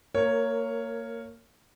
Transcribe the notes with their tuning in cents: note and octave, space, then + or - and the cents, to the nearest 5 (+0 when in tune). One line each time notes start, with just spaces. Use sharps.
A#3 -20 A#4 +0 C#5 +0